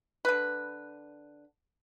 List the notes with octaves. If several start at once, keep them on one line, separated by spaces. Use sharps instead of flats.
D3 B4